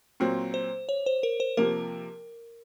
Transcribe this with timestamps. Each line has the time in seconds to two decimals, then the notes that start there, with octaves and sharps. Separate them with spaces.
0.20 A#2 F#3 C4
0.54 C5
0.89 C#5
1.06 C5
1.23 A#4
1.40 C5
1.57 C3 F3 A#3 A#4